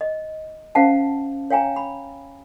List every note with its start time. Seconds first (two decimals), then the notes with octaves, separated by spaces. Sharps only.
0.01 D#5
0.75 C#4 C5 F5 F#5 A5
1.50 C#5 F5 G5 G#5 A#5
1.76 B5